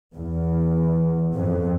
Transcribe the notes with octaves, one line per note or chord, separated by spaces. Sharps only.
E2
F2